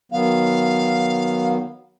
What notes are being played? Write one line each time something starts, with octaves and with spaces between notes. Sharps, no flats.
D#3 F#3 B3 F5